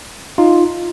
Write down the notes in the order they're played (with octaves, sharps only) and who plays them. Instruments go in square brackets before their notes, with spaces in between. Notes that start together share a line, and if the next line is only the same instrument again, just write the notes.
[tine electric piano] D#4 F4